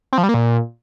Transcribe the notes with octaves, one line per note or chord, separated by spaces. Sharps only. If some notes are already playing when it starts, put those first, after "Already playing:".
C4
F3
G3
A#3
A#2